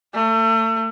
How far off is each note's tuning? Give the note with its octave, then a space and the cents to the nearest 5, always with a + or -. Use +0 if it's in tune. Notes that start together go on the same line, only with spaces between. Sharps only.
A3 +35